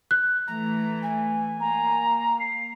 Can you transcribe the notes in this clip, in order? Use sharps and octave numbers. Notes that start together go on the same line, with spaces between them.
F#6
E3 A3 A#5
G#5
A#3 A#5
C7